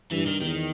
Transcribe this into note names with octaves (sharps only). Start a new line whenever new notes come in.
G2 E3
D#3
E2 D#3